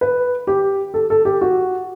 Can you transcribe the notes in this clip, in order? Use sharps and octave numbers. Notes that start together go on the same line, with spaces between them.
B4
G4
A4
A4
G4
F#4